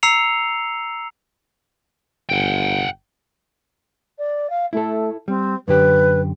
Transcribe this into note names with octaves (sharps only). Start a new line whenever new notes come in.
A#5 E6 C7 C#7 F7
G1 F#5 G5
D5
F5
A3 E4 A4
G3 C4
F#2 D3 G4 B4